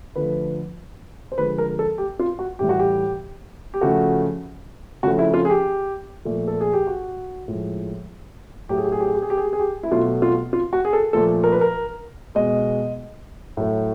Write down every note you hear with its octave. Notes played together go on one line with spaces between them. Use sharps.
D3 F3 A3 B4
C5
D3 F3 G#3 B4
A#4
A4
G4
F4
F#4
A2 E3 G3 G4
F#4
G4
G4
C#3 F3 A3 F#4
C#3 F3 A3 F#4
E4
F4
G#4
G4
A#2 F3 A3
A4
G#4
G4
F#4
A2 F3 G#3
A2 F#3 A3 G4
G#4
G4
G#4
G4
G#4
G4
G#4
G4
G#4
G4
G#4
G4
E4
B2 F#3 A3 F4
F4
F4
F#4
G#4
A4
A#2 F3 A3 A4
A#4
B4
A#4
B2 G#3 D#5
A2 F#3 A3